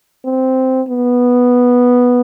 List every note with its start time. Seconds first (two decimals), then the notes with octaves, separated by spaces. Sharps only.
0.25 C4
0.88 B3